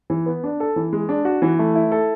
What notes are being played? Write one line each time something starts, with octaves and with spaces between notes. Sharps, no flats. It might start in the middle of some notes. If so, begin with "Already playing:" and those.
E3
B3
D4
A4
E3
G#3
D4
F#4
E3
A3
E4
A4